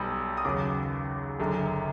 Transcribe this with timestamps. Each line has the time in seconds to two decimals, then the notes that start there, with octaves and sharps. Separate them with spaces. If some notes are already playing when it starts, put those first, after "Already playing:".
Already playing: B1 B2 G3 B5 D#6
0.37 D#6
0.45 D#2 C#3 F#3 D6
1.39 F#1 F#2 D3